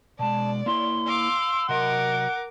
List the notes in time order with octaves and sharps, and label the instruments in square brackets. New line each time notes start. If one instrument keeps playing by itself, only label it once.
[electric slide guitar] B2 G#3 [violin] D5 [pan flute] A5
[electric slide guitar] A#3 E4 C#5 [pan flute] C6
[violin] F5 D6 [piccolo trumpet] E6
[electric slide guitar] C3 F#3 D#5 [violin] A#4 D6 [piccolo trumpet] F#5